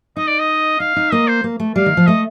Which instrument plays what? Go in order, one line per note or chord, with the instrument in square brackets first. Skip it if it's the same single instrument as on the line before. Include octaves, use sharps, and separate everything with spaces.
[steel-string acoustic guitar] D#4 [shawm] D#5
[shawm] D5
D#5
[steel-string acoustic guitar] D#4 [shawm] F5
[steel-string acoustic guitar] D#4
[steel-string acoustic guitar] A#3 [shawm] D#5
[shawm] C5
[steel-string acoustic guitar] A#3
A3
[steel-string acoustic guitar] G3 [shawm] F5
[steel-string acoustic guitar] D#3
F3
[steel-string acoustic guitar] A3 [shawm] D#5